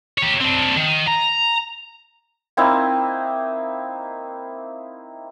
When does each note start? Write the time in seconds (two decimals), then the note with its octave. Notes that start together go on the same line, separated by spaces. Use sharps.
0.18 G4 C#5
0.40 C4 D4
0.76 D#3
1.07 A#5
2.57 A#3 C4 D#4 E4